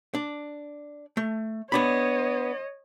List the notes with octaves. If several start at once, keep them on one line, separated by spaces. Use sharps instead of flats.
D4
A3
B3 D4 C#5 D#5 B5